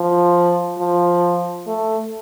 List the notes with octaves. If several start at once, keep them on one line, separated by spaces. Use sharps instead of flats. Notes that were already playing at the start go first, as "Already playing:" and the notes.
Already playing: F3
F3
A3